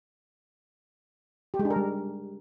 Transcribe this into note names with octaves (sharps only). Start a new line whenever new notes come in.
G4
G#3
D4
A#4
G3